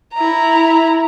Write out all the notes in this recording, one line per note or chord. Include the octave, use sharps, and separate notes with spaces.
E4 A#5